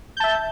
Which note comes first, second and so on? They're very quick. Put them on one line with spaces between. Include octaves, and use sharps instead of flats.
G6 A5 E5